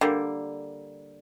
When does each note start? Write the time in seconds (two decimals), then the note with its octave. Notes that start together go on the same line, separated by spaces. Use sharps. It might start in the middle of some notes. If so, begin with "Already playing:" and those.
0.01 D3 G3 A#3